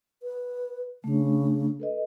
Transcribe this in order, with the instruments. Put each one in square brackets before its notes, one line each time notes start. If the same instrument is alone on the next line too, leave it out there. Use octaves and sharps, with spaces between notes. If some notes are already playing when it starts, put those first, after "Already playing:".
[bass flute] B4
[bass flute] C#3 [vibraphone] A3 D4
[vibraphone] A4 B4 D#5